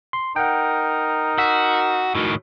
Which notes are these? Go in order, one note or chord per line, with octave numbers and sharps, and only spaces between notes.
C6
D#4 A#4 F#5 G5
F#4 E6 B6
A2 D#3 F#4